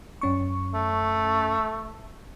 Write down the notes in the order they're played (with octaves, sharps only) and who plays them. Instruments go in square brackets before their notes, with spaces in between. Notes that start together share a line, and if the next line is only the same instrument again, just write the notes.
[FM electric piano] F#2 C#4 C#6
[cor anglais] A3